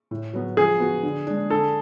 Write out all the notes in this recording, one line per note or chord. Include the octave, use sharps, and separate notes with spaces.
A2
F#3 B3
F3 G#4
B3 F#4
D3
G#3 D4
D3 A4